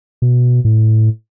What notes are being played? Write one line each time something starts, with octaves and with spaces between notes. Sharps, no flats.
B2
A2